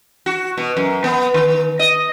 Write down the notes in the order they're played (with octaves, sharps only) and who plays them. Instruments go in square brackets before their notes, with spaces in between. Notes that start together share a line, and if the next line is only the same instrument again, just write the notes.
[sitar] F#4
B2
F#2
B3
D#3
D#5